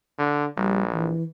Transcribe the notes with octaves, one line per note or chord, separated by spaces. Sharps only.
D3
A#1 G3
E3